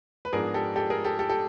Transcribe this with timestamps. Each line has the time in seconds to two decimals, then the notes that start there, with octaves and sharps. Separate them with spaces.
0.25 B4
0.33 G#2 F3 G#3 B3 D4 G#4 A#4
0.54 G4 A4
0.76 G4 A4
0.90 G#4 A#4
1.04 G4 A4
1.19 G4 A4
1.29 G4 A4